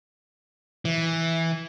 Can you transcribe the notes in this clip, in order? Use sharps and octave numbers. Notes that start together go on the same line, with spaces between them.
E3